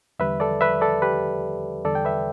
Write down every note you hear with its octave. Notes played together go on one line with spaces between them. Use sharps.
E2 D3 G3 B4 E5
A4 D5
B4 E5
A4 D5
G4 B4
E2 D3 G3 A4 D5
G5
B4 E5